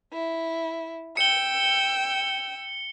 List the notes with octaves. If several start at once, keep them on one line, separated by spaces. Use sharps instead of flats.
E4
G5 E6 C#7 G7